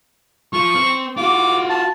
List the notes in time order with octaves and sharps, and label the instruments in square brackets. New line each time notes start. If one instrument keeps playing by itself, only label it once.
[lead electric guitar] F3 [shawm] C#6
[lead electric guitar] C4
[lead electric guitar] F4 F#4 [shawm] D6
[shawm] A5